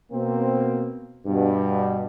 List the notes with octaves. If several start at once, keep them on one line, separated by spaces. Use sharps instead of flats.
B2 A#3 C4
G2 B2